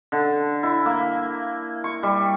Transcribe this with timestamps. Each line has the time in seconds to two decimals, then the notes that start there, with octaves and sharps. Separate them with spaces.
0.12 D3
0.63 E4
0.86 A#3
1.84 C#6
2.03 G3